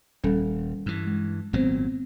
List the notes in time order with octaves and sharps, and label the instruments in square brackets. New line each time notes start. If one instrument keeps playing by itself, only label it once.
[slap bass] D#1 [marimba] G3 C#4 A4
[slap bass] G2 E3
[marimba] G#3
[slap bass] G#1 A#2 F#3 [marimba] B3 C4 C5